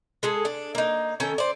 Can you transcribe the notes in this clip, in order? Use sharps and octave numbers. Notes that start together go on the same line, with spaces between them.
G#3 G#4 A4
D4
A#3 D#4
D#3 C#4 A4 G5
C5 D5